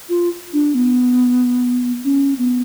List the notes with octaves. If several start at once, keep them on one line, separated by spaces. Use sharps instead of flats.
F4
D4
B3
C#4
B3